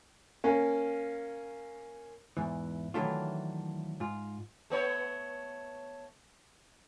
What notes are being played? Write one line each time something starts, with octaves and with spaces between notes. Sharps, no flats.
A#3 C#4
E2 G#2 E3
D#3 E3 F#3 A3 D4 F4
G#2 F4
A3 B3 C#5